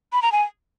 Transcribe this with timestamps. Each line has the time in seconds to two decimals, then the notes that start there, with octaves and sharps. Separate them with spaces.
0.13 B5
0.22 A#5
0.32 G#5